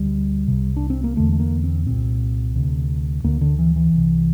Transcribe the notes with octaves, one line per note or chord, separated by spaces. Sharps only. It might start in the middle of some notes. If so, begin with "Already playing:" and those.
Already playing: D2 D3 G3
C2 C3
D4
C4
A#3
E2 D3 A3
A3
A#3
C4
C2 A#2 C4
D2 C3
D2 D3 A#3
D3
E3
E3
C2 C3